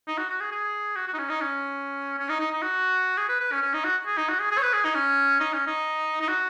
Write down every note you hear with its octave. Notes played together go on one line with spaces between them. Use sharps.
D#4
F#4
F#4
G#4
G#4
F#4
F#4
D#4
C#4
D#4
C#4
C#4
D#4
D#4
D#4
F#4
G#4
B4
B4
C#4
C#4
D#4
F#4
G#4
D#4
F#4
G#4
G#4
C#5
B4
G#4
D#4
C#4
D#4
C#4
D#4
D#4
F#4